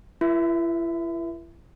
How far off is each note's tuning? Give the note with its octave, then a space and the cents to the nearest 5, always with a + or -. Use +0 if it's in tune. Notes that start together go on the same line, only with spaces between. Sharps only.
E4 +40 A#4 +40 E5 +0